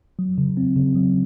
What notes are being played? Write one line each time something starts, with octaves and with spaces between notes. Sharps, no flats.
F#3
C#3
C4
C#3
F#3